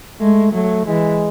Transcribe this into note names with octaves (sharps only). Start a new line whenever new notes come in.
G#3 A3
F#3 A3
E3 G#3